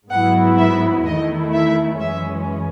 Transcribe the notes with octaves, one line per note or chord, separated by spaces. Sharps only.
G#2 F#3 B3 E4 F#5
E5
E2 D#3 A3 E4 D#5
E5
F#2 E3 G#3 C#4 E5